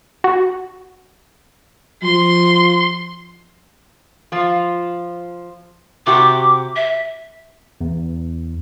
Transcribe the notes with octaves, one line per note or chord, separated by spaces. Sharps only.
F#4
F3 C6
F3 F4
C3 F#4 G4 D6
E5
E2